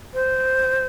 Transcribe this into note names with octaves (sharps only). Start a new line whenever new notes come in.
C5